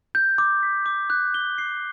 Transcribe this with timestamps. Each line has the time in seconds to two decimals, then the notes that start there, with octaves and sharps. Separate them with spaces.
0.15 G6
0.38 D6
0.63 B6
0.86 D6
1.10 F#6
1.34 G7
1.58 C7